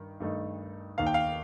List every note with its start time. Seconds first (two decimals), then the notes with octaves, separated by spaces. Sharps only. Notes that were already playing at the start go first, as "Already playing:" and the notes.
Already playing: G2 D#3
0.20 G2 D#3 A3 D#4
0.98 D#2 D#3 A#3 F5
1.07 G5
1.14 F5